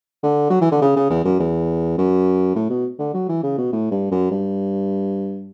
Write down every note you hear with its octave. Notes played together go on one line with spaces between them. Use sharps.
D3
F#3
E3
D3
C#3
C#3
E2
F#2
E2
F#2
A2
B2
D3
F#3
E3
C#3
B2
A2
G2
F#2
G2